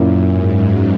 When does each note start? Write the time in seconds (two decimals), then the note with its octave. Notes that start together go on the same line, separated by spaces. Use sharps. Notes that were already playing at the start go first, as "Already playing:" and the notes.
Already playing: F#2 A#2 A#3 C#4 E4
0.31 G#2